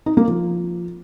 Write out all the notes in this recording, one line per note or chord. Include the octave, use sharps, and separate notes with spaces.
D#4
A#3
F3